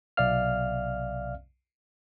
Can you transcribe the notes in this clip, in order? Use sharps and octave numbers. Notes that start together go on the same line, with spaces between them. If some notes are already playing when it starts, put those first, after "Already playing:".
B1 C3 D5 E5 F5 F6